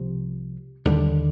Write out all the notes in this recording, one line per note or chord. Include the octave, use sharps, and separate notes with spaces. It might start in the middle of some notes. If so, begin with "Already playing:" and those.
Already playing: C2 C3 F3
D#2 D3 G3